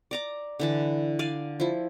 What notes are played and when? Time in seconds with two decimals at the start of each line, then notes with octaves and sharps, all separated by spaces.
0.11 D5 A#5 D6
0.59 D3 E3 A5
1.19 D5 F5 G#5
1.60 F3 E4